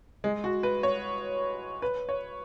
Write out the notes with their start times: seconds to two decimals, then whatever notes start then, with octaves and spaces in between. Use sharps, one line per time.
0.24 G#3
0.44 F#4
0.63 B4
0.83 C#5
1.82 B4
2.09 C#5